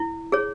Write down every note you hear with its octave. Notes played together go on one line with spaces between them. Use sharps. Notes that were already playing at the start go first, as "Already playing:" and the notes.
Already playing: E4
G#4 C#5